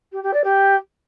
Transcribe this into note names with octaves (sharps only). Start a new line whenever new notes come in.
G4
G4
D5
G4